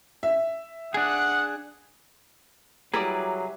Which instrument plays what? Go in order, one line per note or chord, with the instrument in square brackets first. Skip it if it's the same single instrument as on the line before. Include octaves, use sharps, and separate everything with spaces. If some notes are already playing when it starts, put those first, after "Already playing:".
[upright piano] E5
[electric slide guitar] D4 G#4 [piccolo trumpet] F#5 [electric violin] D#6 F#6
[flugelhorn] F#3 [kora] G3 E4 D5 [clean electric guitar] G#4 B4 [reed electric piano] A#5 D6